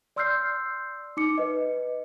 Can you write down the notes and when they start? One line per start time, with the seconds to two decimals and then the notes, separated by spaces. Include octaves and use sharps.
0.16 D5 C6 E6 F6 G6 C7
1.17 D#4 D6 C#7
1.38 B4 D#5